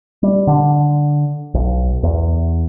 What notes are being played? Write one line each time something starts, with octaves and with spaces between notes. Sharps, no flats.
G3
D3
B1
E2